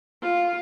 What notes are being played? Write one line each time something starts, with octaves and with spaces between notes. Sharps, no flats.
F4